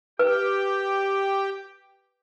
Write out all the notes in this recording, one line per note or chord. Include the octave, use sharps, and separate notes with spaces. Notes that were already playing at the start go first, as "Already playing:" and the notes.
G4 B4 G5